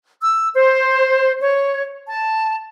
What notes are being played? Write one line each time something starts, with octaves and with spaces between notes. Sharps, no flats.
E6
C5
C#5
A5